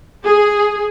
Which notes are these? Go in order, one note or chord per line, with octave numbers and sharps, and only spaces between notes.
G#4